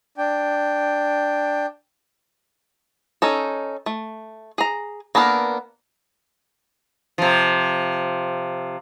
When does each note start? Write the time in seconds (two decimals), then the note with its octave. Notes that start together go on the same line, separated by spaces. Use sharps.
0.18 D4 G5
3.22 C#4 D#4 A4
3.86 A3
4.58 G#4 A#5
5.15 A#3 B3 D4 A4 A#4
7.18 C3 F3